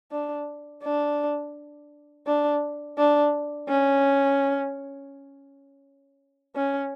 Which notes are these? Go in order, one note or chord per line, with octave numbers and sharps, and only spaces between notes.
D4
D4
D4
D4
C#4
C#4